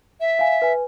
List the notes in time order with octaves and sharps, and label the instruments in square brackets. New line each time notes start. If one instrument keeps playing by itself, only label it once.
[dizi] E5
[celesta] F5 G#5
B4 G#5